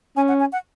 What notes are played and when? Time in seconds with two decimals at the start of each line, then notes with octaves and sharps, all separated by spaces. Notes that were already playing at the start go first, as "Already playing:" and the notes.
0.17 C#4 G#5
0.28 F#5
0.40 G#5
0.52 F#5